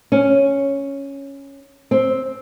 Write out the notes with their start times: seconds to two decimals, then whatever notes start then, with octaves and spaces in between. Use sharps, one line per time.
0.12 C#4
1.91 C4